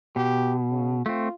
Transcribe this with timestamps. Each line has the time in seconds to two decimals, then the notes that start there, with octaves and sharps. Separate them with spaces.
0.16 B2 G4
0.71 C#3
1.06 A3 C4 F4